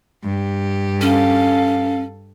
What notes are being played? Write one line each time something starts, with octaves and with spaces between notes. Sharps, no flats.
G2 G4
C#4 A4 F5